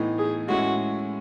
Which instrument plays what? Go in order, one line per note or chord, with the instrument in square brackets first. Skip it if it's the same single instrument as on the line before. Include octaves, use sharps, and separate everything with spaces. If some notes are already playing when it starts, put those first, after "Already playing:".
Already playing: [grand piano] A2 E3 B3 D#4
[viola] G#4
[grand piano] A2 G#3 C#4 E4 [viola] F#4